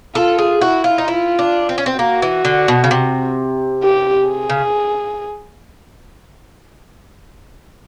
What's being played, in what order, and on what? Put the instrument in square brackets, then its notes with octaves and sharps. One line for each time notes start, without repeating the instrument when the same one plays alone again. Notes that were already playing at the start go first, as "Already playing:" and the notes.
[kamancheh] F4 [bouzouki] A4
[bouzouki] G#4
[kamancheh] E4 [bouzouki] F#4
[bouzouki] F4
D#4
[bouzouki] E4 [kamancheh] F4
[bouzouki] D4
C4
C#4
C4
[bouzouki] A#3 [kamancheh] F#4
[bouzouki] E3
D3
B2
C#3
C3
[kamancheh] G4
G#4
[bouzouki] C#3